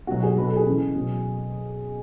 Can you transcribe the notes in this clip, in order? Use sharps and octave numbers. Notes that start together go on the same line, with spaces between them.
B2 F#3 F#4
G#4
B2 F#3 B4
A4
G#4
C#3 E3
B2 F#3